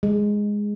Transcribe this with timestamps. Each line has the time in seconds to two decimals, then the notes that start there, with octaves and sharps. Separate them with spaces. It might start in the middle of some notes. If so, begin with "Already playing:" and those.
0.03 G#3